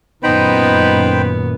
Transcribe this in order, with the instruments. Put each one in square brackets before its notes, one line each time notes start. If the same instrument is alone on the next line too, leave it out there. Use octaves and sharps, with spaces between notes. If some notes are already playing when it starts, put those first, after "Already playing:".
[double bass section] F#2 A#2 D#3 [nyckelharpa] B3 [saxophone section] D#4 [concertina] C5 G5 B5